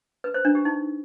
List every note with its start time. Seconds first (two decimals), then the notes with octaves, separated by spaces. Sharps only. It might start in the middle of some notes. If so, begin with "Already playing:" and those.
0.24 B4
0.34 C5
0.45 D4
0.55 G4
0.65 D#4